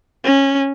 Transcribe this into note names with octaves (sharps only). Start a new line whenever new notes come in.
C#4